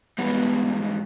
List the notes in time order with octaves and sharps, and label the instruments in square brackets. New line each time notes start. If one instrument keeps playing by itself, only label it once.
[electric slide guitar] G#2 E3 G3 [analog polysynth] B3